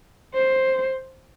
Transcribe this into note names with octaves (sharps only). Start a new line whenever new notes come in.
C5